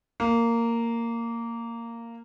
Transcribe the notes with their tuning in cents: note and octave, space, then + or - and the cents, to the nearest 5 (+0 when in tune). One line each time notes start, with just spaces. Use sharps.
A#3 -10